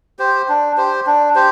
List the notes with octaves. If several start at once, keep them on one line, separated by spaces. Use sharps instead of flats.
G4 C5
D4
G4 C5
D4
G4 C5